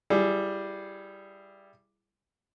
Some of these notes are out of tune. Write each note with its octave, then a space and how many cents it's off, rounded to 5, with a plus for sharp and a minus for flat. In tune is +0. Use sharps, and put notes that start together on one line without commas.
G3 +0 E4 +30 G#4 +0